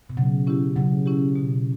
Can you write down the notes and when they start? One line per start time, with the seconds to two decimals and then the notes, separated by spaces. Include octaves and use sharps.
0.10 B2
0.17 C#3 F#3
0.47 C#4 E4 G4
0.76 C#3 F#3
1.06 C#4 E4 G4
1.36 B2